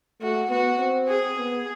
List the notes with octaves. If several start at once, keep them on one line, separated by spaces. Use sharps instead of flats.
A3 F#4
B3 F#4
C4
G#4
B3